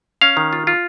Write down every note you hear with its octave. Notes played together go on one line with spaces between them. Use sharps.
C#4 F5
D#3
F4
F4